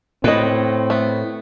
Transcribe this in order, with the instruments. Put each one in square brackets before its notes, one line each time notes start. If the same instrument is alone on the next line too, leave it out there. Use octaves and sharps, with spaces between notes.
[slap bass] A2 [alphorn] C4 [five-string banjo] B4 D#5
[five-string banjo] A3 B3